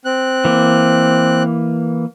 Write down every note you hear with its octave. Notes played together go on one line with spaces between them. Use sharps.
C4 F#6
E3 A#3